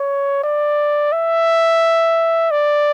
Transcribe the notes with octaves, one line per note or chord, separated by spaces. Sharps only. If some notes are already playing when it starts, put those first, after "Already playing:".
Already playing: C#5
D5
E5
D5